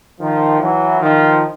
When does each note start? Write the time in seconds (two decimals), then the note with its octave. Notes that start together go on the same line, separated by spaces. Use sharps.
0.20 D#3 F3
0.60 E3 F#3
1.00 D#3 F3